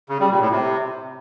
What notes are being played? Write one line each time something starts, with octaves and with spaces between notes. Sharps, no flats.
C#3
G3
A#2
A2
C3